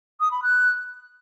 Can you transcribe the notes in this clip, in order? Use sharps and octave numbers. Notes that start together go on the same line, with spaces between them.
D#6
B5
F#6